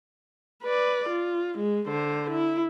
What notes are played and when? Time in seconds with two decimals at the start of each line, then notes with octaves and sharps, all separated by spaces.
0.63 B4 D5
1.09 F4
1.58 G#3
1.88 D3 C5
2.31 E4